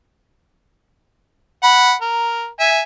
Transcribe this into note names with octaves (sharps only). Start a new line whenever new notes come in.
F#5 B5
A#4
E5 G#5